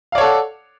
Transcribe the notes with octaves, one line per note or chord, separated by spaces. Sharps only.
A4 C#5 D5 F5 F#5